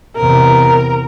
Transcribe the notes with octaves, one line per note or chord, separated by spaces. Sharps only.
E2 C3 A#4